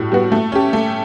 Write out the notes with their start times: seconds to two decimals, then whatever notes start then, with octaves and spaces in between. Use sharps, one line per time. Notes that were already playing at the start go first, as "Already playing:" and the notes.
Already playing: A2 G3 F#4
0.12 G3 B3 F#4
0.32 A3
0.52 C#4 G4
0.73 A3